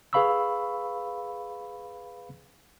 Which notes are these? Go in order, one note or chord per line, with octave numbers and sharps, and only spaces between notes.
G#4 B4 F5 B5 C#6 E6